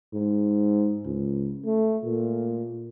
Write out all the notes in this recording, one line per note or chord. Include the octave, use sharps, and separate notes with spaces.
G#2
C#2
A3
A#2